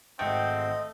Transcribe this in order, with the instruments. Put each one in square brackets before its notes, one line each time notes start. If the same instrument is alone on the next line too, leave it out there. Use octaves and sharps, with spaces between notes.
[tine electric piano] G#1 F#5 G5 [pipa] A3 [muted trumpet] C4 [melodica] D#5